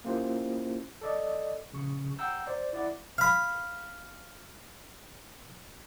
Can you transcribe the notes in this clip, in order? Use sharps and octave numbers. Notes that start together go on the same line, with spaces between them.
A#3 C#4 E4 F4 G4 C5
A4 D5 D#5
A#1 C#3 C#6
F#5 G5 A#5 E6 G6
C5 D5
E4 D5 F#5
F5 B5